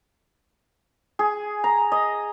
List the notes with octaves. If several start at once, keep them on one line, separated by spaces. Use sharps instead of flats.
G#4
A#5
D#5